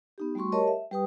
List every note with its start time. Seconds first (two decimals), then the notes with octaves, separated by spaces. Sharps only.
0.18 B3 D#4 G4
0.35 G3 A3 F#4 C6 C#6
0.52 G4 A#4 C#5 D#5 A5
0.67 E5
0.91 G3 G4 B4 G5 D#6